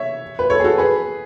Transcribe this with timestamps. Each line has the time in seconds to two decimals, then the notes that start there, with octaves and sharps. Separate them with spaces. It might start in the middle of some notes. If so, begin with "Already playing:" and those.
Already playing: C#5 E5
0.39 B4
0.50 A4 C#5
0.60 G#4
0.64 F#4 A4
0.78 G#4 B4